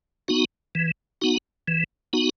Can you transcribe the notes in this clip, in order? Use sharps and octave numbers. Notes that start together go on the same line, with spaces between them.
B3 D#4 F#4
E3
B3 D#4 F#4
E3
B3 D#4 F#4